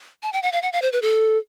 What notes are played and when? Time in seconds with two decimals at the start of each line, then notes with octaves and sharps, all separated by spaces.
0.23 A5
0.33 G5
0.42 F#5
0.52 F5
0.62 F#5
0.73 F5
0.82 C5
0.92 B4
1.02 A4